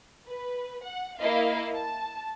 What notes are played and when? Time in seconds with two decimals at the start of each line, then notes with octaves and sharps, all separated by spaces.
0.27 B4
0.83 F#5
1.18 A#3 E4 D#5 F5
1.74 A5